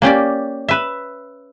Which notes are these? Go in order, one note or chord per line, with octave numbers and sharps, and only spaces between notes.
A#3 C#4 G4 D5
B4 E5